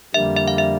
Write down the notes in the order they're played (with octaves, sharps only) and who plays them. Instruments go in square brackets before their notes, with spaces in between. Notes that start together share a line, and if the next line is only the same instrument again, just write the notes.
[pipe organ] F2 D3 G3 A#3 [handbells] E5
[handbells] E5
F5
E5